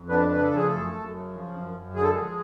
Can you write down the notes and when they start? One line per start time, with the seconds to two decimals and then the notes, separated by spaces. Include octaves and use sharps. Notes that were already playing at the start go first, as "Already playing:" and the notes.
Already playing: F2
0.09 B3 D4 B4
0.30 C#3 B4
0.43 A4
0.50 F3 G#4
0.67 F#2 A3 A4
0.92 F#2
1.13 C#3
1.33 F3
1.54 F#2
1.74 F#2
1.95 D3 G#4
2.03 A4
2.11 F3 G#3 G#4